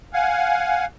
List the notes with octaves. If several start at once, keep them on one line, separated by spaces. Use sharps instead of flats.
F5 F#5 G#5